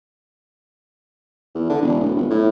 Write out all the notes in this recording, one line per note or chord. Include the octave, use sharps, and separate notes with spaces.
E2
D3
E1
D1
G1
A2